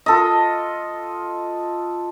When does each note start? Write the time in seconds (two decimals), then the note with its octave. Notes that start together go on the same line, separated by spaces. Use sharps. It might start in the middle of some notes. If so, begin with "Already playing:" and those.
0.06 F4 A4 D#5